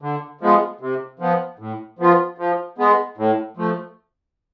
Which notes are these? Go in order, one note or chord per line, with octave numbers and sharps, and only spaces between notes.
D3
F3 G#3 B3
C3
F3 B3
A2
F3 B3 F4
F3
G#3 B3
A2
F3 A3